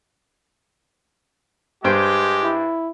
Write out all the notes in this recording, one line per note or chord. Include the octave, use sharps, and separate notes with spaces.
G2 G#3 G4 C5 G5
E4